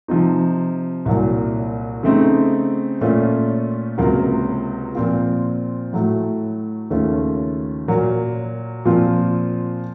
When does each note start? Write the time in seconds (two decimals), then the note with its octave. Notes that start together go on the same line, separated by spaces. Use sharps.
0.08 C3 F3 C4 D#4
1.05 C2 A#2 F#3
2.03 C#3 A3 C4 D#4
3.01 A#2 A3 C#4 F4
3.98 C#2 C3 F#3 A#3 F4
4.95 A#2 F3 C4 F4
5.93 A2 F#3 A3
6.90 D#2 C#3 A3 C#4 F4
7.88 A#2 F#3 A#3
8.85 A#2 F3 C4 F4